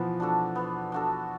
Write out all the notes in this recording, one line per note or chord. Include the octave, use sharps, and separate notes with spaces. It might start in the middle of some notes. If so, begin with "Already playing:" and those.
Already playing: B2 E3 F3 B3
D4 F#4 A4
B3
D4 F#4 A4